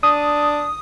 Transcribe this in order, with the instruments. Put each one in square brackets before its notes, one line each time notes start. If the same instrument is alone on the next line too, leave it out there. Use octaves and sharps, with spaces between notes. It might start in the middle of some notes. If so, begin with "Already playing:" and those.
[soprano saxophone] D4 [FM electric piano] D#6